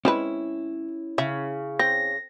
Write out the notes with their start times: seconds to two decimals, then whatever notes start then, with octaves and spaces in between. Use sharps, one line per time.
0.05 G#3 C4 C#4 E4 B4
1.18 C#3 E5
1.79 C4 A#6